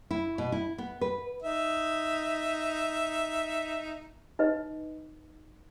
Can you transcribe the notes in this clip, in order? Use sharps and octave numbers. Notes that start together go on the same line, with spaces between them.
E4
B2
E4
B3
B4
D#4 E5
D#4 B4 D#5